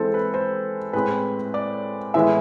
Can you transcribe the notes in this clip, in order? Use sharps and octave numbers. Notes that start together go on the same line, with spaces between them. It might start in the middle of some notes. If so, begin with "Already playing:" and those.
Already playing: E3 G#3 C4 A4 C5
B4
C5
A2 G#3 C4 B4
D5
A2 E3 G#3 B3 E5